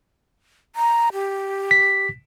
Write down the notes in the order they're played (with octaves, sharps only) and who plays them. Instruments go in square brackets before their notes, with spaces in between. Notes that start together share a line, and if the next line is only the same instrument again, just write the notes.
[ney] A#5
G4
[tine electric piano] B6